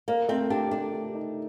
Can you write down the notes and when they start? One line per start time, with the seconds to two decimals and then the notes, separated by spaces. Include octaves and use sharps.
0.08 A#3 A#4
0.29 A3 C4
0.50 D4 G4
0.71 A3 D4
0.93 G4
1.14 D#4